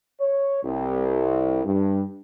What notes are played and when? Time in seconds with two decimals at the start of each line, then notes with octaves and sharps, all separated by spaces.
0.21 C#5
0.64 C2
1.65 G2